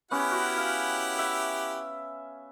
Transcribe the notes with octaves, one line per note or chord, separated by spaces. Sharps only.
B3 C#4 E4 G4 F#5
F#4
F5
E5